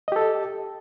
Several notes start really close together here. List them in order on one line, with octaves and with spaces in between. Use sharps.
D#5 G4 A4